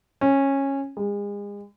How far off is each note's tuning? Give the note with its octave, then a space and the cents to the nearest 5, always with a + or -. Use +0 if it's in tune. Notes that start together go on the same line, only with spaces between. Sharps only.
C#4 -15
G#3 -35